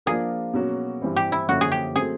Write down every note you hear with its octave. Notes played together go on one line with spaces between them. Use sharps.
F3 A#3 D4 F4 G#4 A#4
B2 F#3 A#3 C#4 F#4
G2 E3 G3 C4
G4
E4
F#2 D3 F3 A#3 C#4 F#4
G#4
G4
F#3 A3 C4 G#4